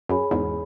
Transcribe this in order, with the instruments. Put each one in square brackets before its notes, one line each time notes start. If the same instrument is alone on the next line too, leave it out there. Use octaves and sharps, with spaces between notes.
[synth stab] F#2 [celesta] G#4 C#5 G#5 B5
[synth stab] E2 G#2